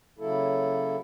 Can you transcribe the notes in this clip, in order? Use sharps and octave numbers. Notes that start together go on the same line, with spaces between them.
C#3 F#3 A#3 E4 A4